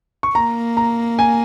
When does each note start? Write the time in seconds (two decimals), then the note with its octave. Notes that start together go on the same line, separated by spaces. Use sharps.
0.23 C#6
0.35 A#3 A#5
0.77 A#5
1.19 G#5